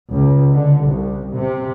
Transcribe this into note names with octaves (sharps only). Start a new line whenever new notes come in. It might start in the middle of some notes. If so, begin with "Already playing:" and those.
C#2
D3
C2
C3